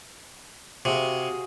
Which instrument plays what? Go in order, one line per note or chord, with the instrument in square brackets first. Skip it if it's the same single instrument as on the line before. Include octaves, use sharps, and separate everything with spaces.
[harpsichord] C3 [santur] F#4 G#4 F5